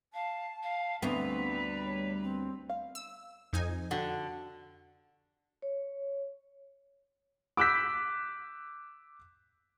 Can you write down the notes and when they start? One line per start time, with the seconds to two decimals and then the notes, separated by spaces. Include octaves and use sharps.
0.14 F5 A5
0.63 F5
1.02 D2 G3 B3 C4 B4 A#5
1.85 C#5
2.22 C4
2.70 F5
2.95 E6
3.53 F2 D#4 G#5
3.91 D3 D4 F#4 G4
5.62 C#5
7.57 D6 E6 F#6 G6 B6